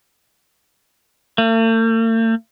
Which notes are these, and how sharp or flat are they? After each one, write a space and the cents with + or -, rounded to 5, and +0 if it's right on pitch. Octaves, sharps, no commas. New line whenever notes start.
A3 +45